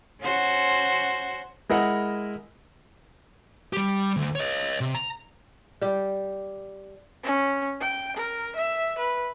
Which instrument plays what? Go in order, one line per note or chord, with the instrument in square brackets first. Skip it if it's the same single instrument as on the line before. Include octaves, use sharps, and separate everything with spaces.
[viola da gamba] C#4 F#4 C5
[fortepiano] G#3 E4 A#4 D#5 F#5
[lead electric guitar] G3 G4
D2
C#5 D#5
C3
A#5
[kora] G3 G4
[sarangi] C#4
G5
A#4
E5
B4